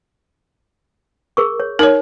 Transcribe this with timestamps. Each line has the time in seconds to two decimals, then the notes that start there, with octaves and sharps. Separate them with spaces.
1.37 G#4 A#4 C#6
1.60 C#5
1.79 D#4 A#4 C#5